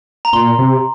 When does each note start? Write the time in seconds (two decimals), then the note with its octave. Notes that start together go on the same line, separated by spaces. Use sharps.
0.25 A#5
0.33 A#2 C6
0.59 C3